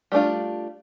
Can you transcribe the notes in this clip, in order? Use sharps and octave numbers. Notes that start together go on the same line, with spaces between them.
G3 A3 D4 F4